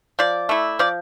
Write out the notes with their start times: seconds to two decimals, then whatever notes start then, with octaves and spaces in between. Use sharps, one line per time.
0.19 F3 D5
0.49 A3 E4
0.79 F3 D5